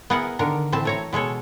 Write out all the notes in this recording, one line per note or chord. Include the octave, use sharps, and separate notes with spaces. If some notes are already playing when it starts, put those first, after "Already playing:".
B3 E4 G#4 A#4 F#5
D3 D#3 D4 A#4
A2 E3 C4 A5
A3 C#5 A#5
B2 G#3 A4 C#5